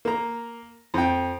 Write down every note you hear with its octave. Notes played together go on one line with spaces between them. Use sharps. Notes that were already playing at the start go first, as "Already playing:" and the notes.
A#3 A#5
F2 G5